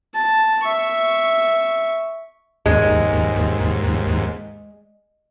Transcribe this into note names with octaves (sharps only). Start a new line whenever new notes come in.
A5
E5 C#6
D#2 G#2 G#3